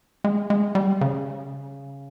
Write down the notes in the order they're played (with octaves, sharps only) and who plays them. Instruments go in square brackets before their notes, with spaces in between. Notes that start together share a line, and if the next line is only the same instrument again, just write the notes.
[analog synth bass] G#3
G#3
G3
C#3